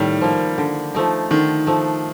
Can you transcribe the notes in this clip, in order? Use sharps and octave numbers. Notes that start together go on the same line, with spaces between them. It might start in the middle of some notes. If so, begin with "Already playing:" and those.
Already playing: A2 D#3 G3
F3 A#3
D3
F3 A3 D#4
D3 D#3
F3 A3 D#4